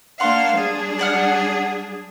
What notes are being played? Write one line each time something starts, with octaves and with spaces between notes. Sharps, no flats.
A#3 D4 F5 F#5 C6
G3 D4 G#4
D5 F#5 F6